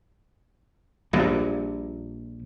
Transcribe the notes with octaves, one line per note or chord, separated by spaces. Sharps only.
A#1 A#2 G3